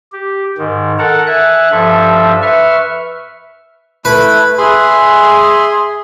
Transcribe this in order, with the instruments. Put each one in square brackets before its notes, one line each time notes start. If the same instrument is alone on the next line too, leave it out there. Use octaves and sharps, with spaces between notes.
[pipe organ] G4
G#2 D#3
A4 A#4 F#5 A5 A#5
E5 G#5 F#6
G2 F3 A4 E5
B4 E5 C#6 F6
[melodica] A3 E4 [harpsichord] B4
[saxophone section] G#4 [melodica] E5 C6